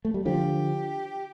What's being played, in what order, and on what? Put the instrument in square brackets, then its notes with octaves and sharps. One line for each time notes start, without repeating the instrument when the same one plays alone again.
[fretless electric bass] A3
G3
[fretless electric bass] D3 F3 [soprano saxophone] G4